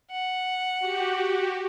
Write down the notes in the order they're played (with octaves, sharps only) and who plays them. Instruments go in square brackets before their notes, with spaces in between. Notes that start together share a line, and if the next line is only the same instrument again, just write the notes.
[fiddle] F#5
[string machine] F#4 G4